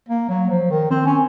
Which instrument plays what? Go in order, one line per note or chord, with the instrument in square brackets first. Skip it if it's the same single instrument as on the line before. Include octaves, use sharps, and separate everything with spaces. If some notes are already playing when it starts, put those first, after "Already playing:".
[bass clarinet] A#3
F#3
F3
D#3
C4
C#4